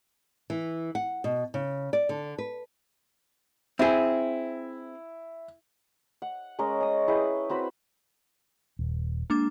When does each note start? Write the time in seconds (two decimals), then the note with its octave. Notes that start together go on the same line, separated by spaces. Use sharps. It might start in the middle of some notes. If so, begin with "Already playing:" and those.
0.50 E3
0.95 F#5
1.24 B2
1.54 C#3
1.93 D5
2.09 D3
2.38 B4
3.79 C4 E4 G#4
6.22 F#5
6.59 G#3 C#4 A#4 D#5
6.81 C#4 D#6
7.07 E4 G#4 B4 G5
7.50 C4 F#4 B4 B5
8.79 D#1
9.30 G#3 A#3 D4 D6